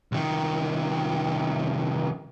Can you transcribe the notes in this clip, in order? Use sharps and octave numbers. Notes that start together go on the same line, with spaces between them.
C2 D#3